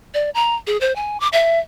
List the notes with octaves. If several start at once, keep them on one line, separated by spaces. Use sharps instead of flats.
D5
A#5
G#4
C5
G#5
D6
E5